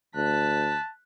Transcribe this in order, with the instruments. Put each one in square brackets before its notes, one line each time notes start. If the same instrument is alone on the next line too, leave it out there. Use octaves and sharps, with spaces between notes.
[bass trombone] D2 [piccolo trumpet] A5 [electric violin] F#6 B6